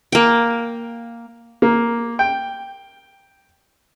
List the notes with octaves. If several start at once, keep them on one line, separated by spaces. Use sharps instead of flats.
A#3 G5
A#3
G5